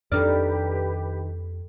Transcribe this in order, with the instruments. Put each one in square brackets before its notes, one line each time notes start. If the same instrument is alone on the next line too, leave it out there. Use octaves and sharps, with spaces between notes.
[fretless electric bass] F2 D4 [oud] D#3 D5 [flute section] G4 B4 [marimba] A4 F6